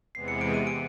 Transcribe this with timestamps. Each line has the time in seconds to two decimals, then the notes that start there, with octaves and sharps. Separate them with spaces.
0.15 E2 C3 E3 G#3 B3 C7
0.28 C#7
0.41 D7
0.54 D#7
0.67 D7